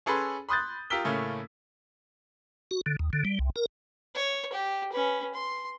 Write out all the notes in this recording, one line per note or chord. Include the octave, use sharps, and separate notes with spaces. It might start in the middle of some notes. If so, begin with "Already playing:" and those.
C#4 G#4 A4 B4 B5 C6
B5 C6 D#6 F#6 G6 A6
F4 G4 A#4 E6 B6 G7
A2 C#3 A3 A#3 C#4
F#4
D3
D#2
D3
G3
C2
A#4
C#5
G4
C#4 B4
C6